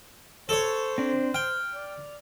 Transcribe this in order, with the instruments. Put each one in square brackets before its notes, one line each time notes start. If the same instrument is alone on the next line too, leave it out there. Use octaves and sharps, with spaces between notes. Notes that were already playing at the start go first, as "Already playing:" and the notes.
[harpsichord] A4 C#5 [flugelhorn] C5
[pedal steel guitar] C4 D4
[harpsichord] G5 [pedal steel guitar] F6
[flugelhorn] D5